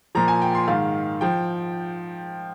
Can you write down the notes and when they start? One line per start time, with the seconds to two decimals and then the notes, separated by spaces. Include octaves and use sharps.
0.15 A#2 F3 A#5
0.28 G#5
0.42 G5
0.55 C6
0.68 G#2 D#3 F5
1.21 F3 G5